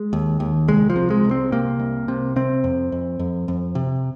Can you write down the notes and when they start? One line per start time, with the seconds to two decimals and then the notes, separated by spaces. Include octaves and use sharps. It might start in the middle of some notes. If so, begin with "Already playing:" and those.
Already playing: G#3
0.13 D#2
0.40 D#2
0.68 C2 G#3
0.90 F3
0.96 C3
1.10 G#3
1.25 C2
1.31 C4
1.52 C3 A#3
1.80 C2
2.08 C3
2.36 C3 C4
2.64 F2
2.92 F2
3.19 F2
3.48 F2
3.75 C3